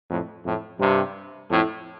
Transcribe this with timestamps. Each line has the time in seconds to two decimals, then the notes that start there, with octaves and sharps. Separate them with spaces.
0.10 F2 A2
0.45 F2 A2
0.80 G2 C3
1.51 F2 A2